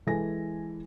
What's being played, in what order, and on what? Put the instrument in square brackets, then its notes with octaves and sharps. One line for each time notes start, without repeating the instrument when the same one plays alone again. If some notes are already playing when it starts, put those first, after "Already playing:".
[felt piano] E3 G#3 A4 G#5 A#6